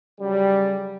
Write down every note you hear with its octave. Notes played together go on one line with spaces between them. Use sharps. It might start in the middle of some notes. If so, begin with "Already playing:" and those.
C#3 F#3 G3